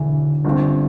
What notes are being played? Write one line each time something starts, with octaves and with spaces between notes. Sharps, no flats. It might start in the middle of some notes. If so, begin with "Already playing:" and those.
Already playing: E1 E2 D3 E3
G1 G2 D3 C4